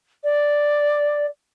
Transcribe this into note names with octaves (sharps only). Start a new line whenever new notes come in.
D5